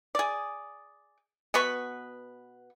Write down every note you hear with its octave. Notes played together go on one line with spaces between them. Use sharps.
G#4 D5
B2 B3 B4 C#6